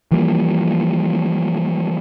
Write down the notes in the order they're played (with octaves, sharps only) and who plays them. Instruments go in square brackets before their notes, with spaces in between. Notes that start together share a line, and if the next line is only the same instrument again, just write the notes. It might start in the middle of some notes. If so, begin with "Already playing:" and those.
[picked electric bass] E3 F3 G3 A#3